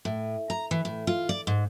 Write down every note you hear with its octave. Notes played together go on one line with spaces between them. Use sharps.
A2
A#5
E3
A2
F4
D5
G#2